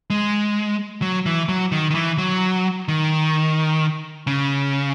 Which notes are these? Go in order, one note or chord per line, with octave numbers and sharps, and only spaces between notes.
G#3
F#3
E3
F#3
D#3
D#3
E3
F#3
D#3
C#3